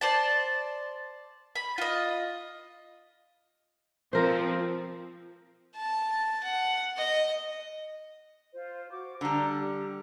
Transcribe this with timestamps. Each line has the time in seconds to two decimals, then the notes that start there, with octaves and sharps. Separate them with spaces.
0.01 C5 D5 A5
1.55 B5
1.78 F4 D#5
4.13 F3 C4 A#4 C5
5.76 A5
6.43 F#5
6.97 D#5
8.53 F4 C5
8.91 F#4 D6
9.21 D3 G3 D5 A5 A#5
9.58 G4